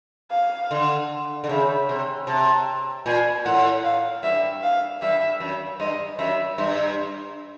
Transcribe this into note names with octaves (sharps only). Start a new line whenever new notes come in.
F5
D3
D3
C#3 E5
C3
C3 A5
A#2 G#5
A2 F#5
F5
G2 E5
F5
G2 E5
F#2
G2 D#5
F#2 E5
G2 E5